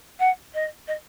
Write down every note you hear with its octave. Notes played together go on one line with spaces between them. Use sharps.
F#5
D#5
D#5